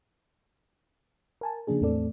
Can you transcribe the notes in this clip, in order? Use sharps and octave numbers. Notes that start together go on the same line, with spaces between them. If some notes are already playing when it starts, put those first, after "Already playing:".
A#4 G#5 A5
C#3 F3 A#3 D4 G#4
E2 A2 A3 C4 A4 D5